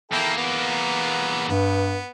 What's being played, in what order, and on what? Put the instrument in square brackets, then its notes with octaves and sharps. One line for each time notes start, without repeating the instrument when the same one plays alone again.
[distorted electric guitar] E2 A#3 [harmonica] E4 A4 G5
[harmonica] B3
[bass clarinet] G2 [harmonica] B3